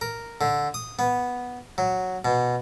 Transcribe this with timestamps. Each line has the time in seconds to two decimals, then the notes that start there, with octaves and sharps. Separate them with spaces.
0.01 A#4
0.41 D3
0.74 D#6
0.99 B3
1.78 F#3
2.25 B2